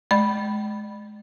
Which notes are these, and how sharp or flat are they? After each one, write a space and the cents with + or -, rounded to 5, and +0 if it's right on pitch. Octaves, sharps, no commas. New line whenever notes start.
G#3 +30 D5 +45 B5 +0